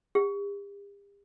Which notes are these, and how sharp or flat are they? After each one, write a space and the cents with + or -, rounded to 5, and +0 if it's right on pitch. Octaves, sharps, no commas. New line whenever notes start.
G4 +45